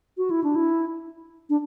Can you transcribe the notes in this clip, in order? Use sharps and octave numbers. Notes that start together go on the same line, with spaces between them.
F#4
E4
D4
E4
D4